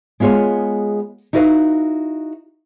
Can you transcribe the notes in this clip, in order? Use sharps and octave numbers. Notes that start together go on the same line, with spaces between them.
G#3 B3 F4 G#4 C#5
D#4 E4 F#4 B4 D5 F5